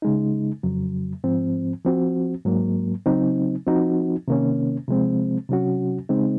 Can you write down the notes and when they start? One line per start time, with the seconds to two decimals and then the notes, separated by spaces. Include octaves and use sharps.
0.02 C#3 G#3 D#4
0.63 F2 C#3 F#3
1.24 G#2 F3 C4
1.85 F3 C4 F#4
2.45 G#2 F#3 A#3
3.06 C#3 F#3 C4 D#4
3.67 F3 C4 D#4 F#4
4.28 C3 D#3 A#3 C#4
4.88 C3 F3 G#3 C4
5.49 C3 F#3 C#4 F#4
6.09 C#3 G#3 C4 D#4